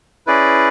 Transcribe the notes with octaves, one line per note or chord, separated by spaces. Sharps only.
C#4 E4 G#4 B4 D5